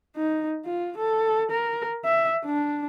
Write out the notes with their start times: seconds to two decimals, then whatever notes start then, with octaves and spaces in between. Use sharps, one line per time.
0.16 D#4
0.65 F4
0.97 A4
1.51 A#4
2.05 E5
2.45 D4